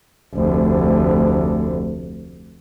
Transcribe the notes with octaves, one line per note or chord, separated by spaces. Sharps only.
F1 D2